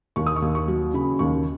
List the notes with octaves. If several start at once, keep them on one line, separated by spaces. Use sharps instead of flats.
D#2 C#6
D#6
C#6
D#2
C#6
F#3
C#3 B5
D#2 C#6